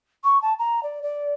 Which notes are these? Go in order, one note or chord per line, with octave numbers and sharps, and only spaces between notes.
C#6
A5
A#5
D5
D5